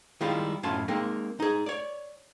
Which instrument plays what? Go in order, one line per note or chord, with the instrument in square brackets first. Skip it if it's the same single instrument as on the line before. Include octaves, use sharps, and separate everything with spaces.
[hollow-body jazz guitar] D#3 G3 G#3 E4 F4
F#2 A2 C#4 F4 A5
G#3 A#3 C4 D#4
D#4 G#4
C#5 D5